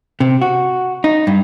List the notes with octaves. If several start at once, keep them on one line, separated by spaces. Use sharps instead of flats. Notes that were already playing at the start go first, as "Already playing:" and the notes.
C3
F#4
D#4
G2